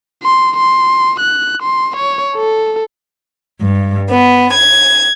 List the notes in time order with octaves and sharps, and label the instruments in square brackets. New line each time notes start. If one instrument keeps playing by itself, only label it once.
[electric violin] C6
C6
F#6
C6
C#5
A4
[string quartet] G2
B3
G#6